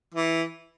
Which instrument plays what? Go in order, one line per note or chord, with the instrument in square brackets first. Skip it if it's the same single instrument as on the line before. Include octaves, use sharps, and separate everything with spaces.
[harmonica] E3